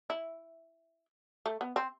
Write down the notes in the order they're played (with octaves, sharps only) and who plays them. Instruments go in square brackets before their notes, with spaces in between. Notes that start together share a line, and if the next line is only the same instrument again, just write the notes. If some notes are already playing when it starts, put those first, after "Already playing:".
[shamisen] E4
A3
B3
C4